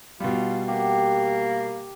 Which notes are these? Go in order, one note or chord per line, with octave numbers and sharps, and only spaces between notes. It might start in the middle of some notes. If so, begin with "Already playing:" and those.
B2 G3 F4
A#3 G4 F#5